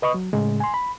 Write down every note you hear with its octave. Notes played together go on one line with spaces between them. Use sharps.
B4 D#5 B5 C#6 D#6
F#3
A2 C#3 G#3
G#5 C6
B5